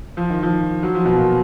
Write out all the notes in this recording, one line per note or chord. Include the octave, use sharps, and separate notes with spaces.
F3
D#3
F3
F#3
F3
B2
A#2